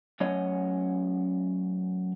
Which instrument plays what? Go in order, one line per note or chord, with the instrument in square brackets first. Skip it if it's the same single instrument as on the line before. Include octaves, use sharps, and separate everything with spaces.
[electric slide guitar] F#2 A3 C#4 C#5 D#5